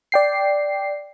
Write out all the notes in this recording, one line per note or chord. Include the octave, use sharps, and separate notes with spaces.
D5 G5 C7